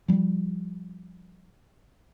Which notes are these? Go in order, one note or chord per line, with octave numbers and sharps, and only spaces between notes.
F3 G3